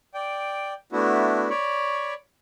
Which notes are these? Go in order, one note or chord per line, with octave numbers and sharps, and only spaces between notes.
D5 G5
A3 B3 D4 E4 F#4
C#5 D5 B5 C#6